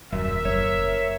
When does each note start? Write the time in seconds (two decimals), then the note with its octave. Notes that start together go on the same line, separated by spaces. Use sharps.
0.12 D#1 F#2 A#4 E5
0.45 F#1 C#5